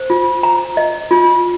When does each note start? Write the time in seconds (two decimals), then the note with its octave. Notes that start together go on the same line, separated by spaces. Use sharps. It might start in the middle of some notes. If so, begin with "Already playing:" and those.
Already playing: C5
0.10 F4
0.43 A#5
0.77 D#5
1.11 F4